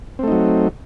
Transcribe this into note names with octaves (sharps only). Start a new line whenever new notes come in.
F#3 A3 C4 D#4